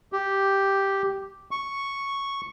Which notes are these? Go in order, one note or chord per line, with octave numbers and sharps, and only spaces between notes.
G4
C#6